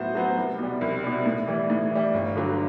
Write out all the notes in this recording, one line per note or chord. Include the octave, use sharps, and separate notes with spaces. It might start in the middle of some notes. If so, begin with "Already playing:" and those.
Already playing: A2 F#3 B3 F#4 C5
F#3 B3 F#4 C5
C2
B2 G3
C2
B2 G3
A2
E3 G3
A2
E3 G3
G1
G2 D3 F#3